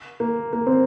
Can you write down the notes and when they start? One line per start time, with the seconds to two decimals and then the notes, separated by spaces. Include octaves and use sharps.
0.20 A#3
0.53 A#3
0.66 C4